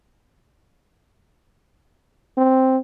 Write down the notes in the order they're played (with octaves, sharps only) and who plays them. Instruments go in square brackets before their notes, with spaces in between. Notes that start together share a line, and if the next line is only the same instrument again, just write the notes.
[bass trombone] C4